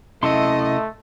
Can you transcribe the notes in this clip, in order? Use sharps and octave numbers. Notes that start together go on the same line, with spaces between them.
C3 A3 C#4 E4 D#5 E5 A5 C6